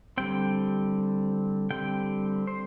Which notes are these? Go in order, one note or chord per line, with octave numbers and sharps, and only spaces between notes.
D3 G3 C4 G5
D3 G3 C4 G5
C5